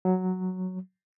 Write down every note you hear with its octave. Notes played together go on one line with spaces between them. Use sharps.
F#3